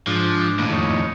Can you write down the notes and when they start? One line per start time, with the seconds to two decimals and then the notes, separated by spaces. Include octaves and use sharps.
0.07 G#2 F3 D4
0.59 D#2 A2
0.72 F2 D#4 C#5